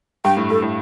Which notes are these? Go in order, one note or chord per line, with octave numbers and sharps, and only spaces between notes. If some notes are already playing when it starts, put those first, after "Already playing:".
G2 G5
A2
G2 A4
A2